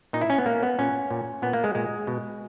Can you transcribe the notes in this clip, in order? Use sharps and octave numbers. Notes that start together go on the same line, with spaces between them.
A#2 D#4
E4
C#4
B3
A#2 A#3
B3
A#2 C#4
A#2
A#2 B3
A#3
G#3
A#2 G#3
B2